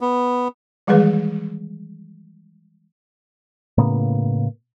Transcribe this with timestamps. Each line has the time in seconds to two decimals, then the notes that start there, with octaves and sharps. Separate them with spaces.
0.01 B3
0.87 D#3 E3 G3 G#3 G#4 B4
3.78 A2 C#3 A#3 B3